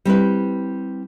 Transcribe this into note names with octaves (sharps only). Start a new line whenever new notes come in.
G3 C4 E4 B4